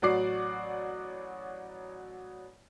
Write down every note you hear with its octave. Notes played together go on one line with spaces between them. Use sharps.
A1 F#3 F#4 D5 D6 C7